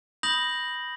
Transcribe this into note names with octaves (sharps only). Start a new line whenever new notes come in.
B5 D#6 G6 A#6 F#7